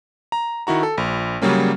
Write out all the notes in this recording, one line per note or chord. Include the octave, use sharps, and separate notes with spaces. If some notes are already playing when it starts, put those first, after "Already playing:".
A#5
D#3 E4 F#4 A#5
A4
A#1
C#3 F#3 G3 A#3 C#4